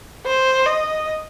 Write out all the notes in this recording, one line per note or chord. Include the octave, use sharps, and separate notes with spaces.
C5
D#5